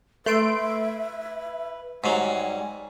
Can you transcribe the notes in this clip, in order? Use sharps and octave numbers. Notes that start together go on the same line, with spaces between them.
A3 B4 E5 C6 D7
G#2 F#3 G3 G#5